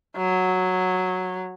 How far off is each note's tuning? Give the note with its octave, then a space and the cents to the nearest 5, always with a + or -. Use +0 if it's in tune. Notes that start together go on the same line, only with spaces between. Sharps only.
F#3 -5